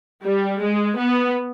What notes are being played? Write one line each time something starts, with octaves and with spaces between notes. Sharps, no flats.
G3
G#3
B3